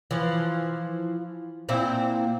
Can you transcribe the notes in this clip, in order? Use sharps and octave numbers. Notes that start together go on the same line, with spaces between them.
E3 F3
A#2 C4 E4